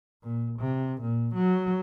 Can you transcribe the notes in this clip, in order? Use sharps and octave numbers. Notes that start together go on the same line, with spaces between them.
A#2
C3
A#2
F#3